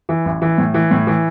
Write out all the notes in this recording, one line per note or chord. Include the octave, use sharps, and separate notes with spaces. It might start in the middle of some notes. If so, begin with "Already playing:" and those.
E3
A1
E3
A2
E3
A2
E3